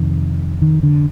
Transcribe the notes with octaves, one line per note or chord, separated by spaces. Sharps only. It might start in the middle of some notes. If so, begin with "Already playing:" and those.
Already playing: F2 C3 D#3
D#3
D3